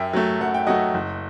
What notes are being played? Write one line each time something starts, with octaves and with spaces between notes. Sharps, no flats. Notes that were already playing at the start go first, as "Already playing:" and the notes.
Already playing: F#2 E5 G5
F#3 A3
F#2 F#5
G5
F#3 A3 D#5 F#5
F#1